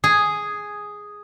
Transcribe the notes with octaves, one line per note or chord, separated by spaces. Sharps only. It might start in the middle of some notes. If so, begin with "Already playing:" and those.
G#4